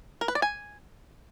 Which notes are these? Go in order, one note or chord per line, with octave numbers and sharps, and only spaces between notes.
A#4
B4
D5
G#5